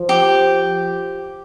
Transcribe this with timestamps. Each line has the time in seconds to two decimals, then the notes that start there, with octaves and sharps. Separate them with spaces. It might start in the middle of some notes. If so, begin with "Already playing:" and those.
Already playing: F3
0.09 G4